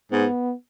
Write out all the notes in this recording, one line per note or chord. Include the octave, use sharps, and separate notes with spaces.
G#2 B3